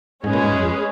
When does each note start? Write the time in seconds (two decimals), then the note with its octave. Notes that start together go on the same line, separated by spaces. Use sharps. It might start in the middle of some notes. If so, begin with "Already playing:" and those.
0.24 G#2 G#3 C#4 G#4 B4
0.33 A#2
0.44 G#2
0.53 F#2
0.63 F2